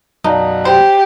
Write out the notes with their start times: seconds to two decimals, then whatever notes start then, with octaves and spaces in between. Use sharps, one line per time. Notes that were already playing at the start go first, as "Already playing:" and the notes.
0.24 F#2 B2 F#3 D#4 D5 F5 A5
0.65 G4 C5